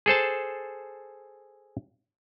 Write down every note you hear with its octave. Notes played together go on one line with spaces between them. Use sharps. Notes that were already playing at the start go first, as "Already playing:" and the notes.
G#4 A4 C5 A5